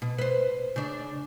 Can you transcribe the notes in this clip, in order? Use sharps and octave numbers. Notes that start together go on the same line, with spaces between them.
B2
B4 C5
C#3 D4